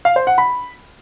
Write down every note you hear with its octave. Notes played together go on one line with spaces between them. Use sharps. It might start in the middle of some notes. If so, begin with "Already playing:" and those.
F5
C5
F#5
B5